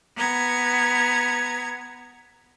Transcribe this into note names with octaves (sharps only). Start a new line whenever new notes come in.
B3 A#5 G#6